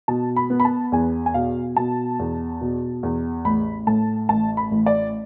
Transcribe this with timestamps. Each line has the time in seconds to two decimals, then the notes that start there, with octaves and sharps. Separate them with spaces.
0.08 B2 A5
0.36 B5
0.50 B3
0.60 B5
0.65 A5
0.92 E2 G#5
1.26 G#5
1.34 B2 F5
1.76 B2 A5
2.19 E2
2.61 B2
3.03 E2
3.45 A1 B5
3.87 A2 A5
4.29 A1 A5
4.57 B5
4.71 A1
4.86 D5